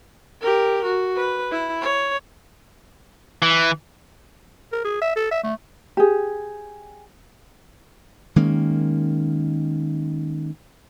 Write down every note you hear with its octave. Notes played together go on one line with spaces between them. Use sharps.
G4 A#4
F#4
B4
E4
C#5
E3
A#4
G#4
E5
A4
E5
A3
G4 G#4
D#3 G#3 A#3 C#4